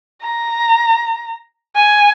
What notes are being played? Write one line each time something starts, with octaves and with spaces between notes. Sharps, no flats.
A#5
G#5